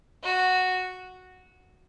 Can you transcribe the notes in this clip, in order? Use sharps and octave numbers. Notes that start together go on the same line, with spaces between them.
F#4